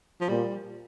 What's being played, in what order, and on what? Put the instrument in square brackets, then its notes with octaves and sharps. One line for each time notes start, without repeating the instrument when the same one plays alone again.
[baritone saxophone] F3
[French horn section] A#2 [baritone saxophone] G3